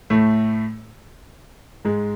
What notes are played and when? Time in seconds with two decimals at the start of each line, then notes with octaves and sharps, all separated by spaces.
0.10 A2 A3
1.85 G#2 G#3